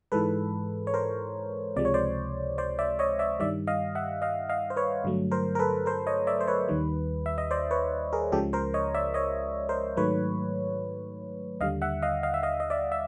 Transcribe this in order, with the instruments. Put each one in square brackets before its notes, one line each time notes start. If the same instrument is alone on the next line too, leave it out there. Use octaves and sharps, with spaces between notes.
[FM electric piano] G#2 E3 G#3 A4 B4
C#5
A#4 C5
C#2 C3 F3 G#3 D5
C#5
C5 D5
C5 D5
D5 E5
C#5 D#5
D5 E5
G2 D#3 G3 D5 E5
D#5 F5
E5 F#5
D#5 F5
D#5 F5
C5
B4 C#5
G2 D3 F#3 A3
A#4 C5
A#4
A4 B4
A#4 C5
C#5 D#5
D5 E5
C5
B4 C#5
D#2 D#3 G3
E5
D#5
C5 D5
B4 C#5
G#4 A#4
C#2 C#3 F3 G#3 G4 A4
A#4 C5
C#5 D#5
D5 E5
C#5 D#5
A#4 C5
G#2 D#3 F#3 A3 B4 C#5
D#2 D3 G3 D#5 F5
E5 F#5
D#5 F5
D#5 F5
E5
D#5 F5
D#5
D5 E5
E5